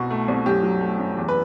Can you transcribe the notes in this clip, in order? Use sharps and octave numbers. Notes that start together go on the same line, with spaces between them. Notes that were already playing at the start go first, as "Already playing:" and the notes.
Already playing: C2 B2 F#4
A3
C2
F#2 G4
F#3
A3
F#2
E2
B4